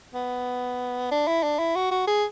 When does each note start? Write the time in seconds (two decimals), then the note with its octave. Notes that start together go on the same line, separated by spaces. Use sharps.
0.14 B3
1.11 D4
1.27 E4
1.43 D4
1.59 E4
1.76 F#4
1.92 F#4
2.07 G#4